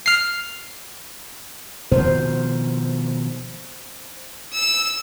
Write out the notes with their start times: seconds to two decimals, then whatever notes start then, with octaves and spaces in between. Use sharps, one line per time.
0.06 F6 C7
1.92 B2 D#3 F3 C5
4.53 E6